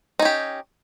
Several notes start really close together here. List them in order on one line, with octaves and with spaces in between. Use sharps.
D#4 C#4 G4